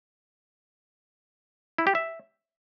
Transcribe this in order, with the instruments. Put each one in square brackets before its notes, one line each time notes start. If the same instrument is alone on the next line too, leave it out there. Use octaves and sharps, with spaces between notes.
[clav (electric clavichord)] E4
G4
E5